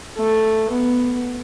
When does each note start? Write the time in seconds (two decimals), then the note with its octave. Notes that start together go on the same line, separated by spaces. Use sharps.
0.17 A3
0.70 B3